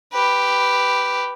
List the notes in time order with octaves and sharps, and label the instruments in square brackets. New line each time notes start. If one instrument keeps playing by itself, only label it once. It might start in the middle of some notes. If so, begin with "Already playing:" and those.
[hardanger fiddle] G4 B4